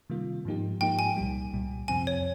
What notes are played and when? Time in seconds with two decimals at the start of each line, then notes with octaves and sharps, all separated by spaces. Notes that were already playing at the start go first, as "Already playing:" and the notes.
0.10 C3 D#3 G3 A#3 F4
0.45 G#2 F3 A#3 D#4 G4
0.81 G#2 F3 A#3 D#4 G4 G5
0.99 G#5
1.17 C2 A#2 G3
1.53 C2 A#2 G3
1.88 F2 C3 F3 C4 G#5
2.07 C#5